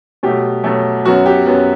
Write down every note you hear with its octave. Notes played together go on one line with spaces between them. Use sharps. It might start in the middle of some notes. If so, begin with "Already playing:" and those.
B2 F#3 A3 G4
B2 F#3 A3
F#2 F#3 B3 F#4
G4
F#2 F#3 B3